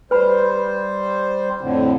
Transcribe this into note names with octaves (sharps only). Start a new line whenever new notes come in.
G3 B4 C5 B5
F2 A2 D3